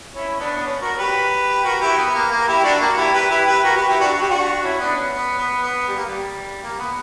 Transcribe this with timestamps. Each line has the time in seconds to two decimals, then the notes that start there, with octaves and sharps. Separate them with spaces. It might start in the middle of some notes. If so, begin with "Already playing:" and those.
0.15 C#4 E4
0.40 B3 D4
0.56 B3
0.65 C#4
0.81 F#4 A#4
0.98 G4 B4
1.64 F#4 A#4
1.81 E4 G4
1.98 B3
2.14 A#3
2.31 A#3
2.40 A#4
2.47 E4 G4
2.59 G4
2.63 D4 F#4
2.80 A#3
2.97 E4 G4
3.13 G4 B4
3.30 E4 G4
3.47 G4 B4
3.63 F#4 A#4
3.76 G4 B4
3.88 E4 G4
4.00 D4 F#4
4.13 F#4
4.21 G4
4.29 D4 F#4
4.62 C#4 E4
4.80 B3 D4
4.96 C#4
5.12 B3
5.38 B3
5.62 B3
5.88 G3
5.97 A#3
6.06 G3
6.62 A#3
6.79 B3